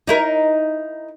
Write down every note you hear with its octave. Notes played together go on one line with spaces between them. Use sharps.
D#4 E4 A#4